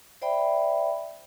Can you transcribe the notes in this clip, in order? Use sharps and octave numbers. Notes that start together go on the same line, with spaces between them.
C5 D5 E5 G5 B5